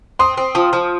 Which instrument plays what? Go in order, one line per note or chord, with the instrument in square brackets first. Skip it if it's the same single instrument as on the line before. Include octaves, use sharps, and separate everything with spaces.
[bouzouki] C4 [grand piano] C6 D#6
[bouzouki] C4
F3
F3